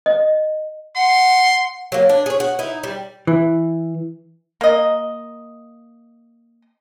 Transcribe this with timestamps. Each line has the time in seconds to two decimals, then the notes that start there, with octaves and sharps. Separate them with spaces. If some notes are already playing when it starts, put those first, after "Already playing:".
0.06 D#5
0.96 F#5 C6
1.92 F#3 A#3
2.09 D4
2.26 G#4 C#5
2.40 F#4
2.59 D#4 E4
2.83 G3
3.27 E3
4.61 A#3 D#5